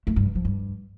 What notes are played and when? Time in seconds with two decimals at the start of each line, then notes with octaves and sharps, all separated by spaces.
0.07 A3
0.16 G2
0.26 E3
0.35 F3
0.45 G2